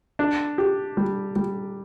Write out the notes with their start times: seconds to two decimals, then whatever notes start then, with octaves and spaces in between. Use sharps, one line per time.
0.19 D4
0.58 G4
0.97 G3
1.36 G3